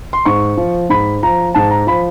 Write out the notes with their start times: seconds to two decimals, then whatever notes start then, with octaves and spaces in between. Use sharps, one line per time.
0.13 C6
0.26 G#2 C#6
0.57 F3
0.90 G#2 B5
1.23 F3 A#5
1.55 G#2 A5
1.71 A#5
1.87 F3 B5